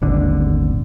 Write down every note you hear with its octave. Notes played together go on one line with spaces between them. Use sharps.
D#1 G#1 D3